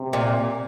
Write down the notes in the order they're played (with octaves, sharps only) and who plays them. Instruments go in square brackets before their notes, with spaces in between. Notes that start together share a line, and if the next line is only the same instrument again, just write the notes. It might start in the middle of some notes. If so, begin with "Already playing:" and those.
Already playing: [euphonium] C3
[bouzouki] A#2